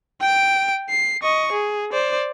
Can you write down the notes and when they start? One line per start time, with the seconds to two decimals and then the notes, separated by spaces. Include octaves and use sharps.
0.21 G5 D7
0.90 C7
1.23 D#5 C#6
1.52 G#4
1.93 C5 D5